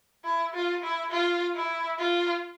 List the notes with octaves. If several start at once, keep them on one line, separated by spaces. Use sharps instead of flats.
E4
F4
E4
F4
E4
F4